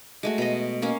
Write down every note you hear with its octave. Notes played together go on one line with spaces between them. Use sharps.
G#3 A3 F#4
B2 D#5
A#3 C#4 F5